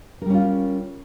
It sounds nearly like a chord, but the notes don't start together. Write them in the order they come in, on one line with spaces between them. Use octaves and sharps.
A#4 G3 C#4 F4